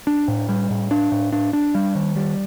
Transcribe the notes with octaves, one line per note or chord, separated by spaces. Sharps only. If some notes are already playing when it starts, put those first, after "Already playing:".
D4
A2
G3
A2
D4
A2
D4
D4
G3
D#3
G3